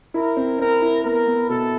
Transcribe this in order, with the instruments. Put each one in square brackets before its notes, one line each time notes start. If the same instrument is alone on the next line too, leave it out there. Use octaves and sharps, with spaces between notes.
[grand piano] E4 [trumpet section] A#4
[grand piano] C4
[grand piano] C4 [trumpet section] A#4
[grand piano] E4
[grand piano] B3 [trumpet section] A#4
[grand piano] B3
[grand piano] B2 [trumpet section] A4